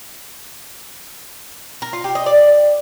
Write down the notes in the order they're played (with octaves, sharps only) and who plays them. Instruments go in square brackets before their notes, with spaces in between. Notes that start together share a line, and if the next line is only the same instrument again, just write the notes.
[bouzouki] A#4
F4
G4
D#5
D5